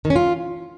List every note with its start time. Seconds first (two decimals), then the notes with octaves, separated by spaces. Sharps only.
0.05 D#3
0.10 C#4
0.16 F4